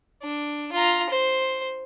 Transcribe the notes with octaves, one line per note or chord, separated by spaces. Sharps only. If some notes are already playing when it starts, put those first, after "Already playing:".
D4
F4 A#5
C5